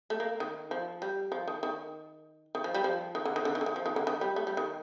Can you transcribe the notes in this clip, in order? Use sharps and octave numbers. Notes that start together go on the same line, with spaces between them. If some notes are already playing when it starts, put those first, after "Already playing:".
A3
A#3
D#3
F3
G3
F3
D#3
D#3
D#3
F3
G3
F3
D#3
D3
D#3
D3
D#3
D3
D#3
F3
D#3
D3
D#3
G3
A3
G3
D#3